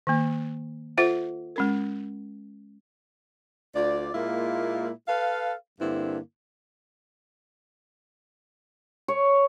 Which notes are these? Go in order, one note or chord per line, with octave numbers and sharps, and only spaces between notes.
D#3 A#3
F4 A4 C5 E5 F#5
G#3 C#4 A#4
D2 F4 D5
A#2 G#3 A#3 E4 F4
A4 B4 F5
G2 D3 A#3 C4 E4
C#5